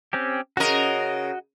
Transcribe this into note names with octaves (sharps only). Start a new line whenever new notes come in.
C4 C#4 G4
C#3 F#4 A#4 D#5